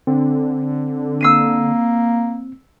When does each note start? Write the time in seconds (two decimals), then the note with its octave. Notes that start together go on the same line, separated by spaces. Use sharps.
0.07 D3 C4
1.21 A#3 E6 C7 D#7